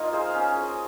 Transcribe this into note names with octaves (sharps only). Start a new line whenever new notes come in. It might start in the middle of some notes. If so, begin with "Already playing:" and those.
Already playing: A#3 D#4 F4 A#4
G#4 C5 F5
C#4
G#4
C5